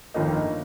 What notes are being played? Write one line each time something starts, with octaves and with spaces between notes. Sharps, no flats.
G1 F2 D#3 A#3 D#4